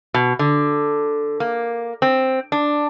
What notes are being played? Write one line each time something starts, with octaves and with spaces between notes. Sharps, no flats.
B2
D3
A#3
C4
D4